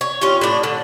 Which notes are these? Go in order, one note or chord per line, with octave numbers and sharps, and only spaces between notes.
C#5
C#4 F4 G4
A2 D4
D3